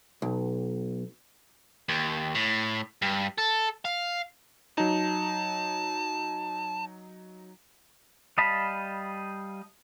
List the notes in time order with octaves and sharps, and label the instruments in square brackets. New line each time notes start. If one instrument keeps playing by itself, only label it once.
[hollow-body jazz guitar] B1
[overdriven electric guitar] D#2
A2
G2
A4
F5
[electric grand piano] F#3 D#4 [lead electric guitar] A5
[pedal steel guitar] G3 D#5 F5 A5 B5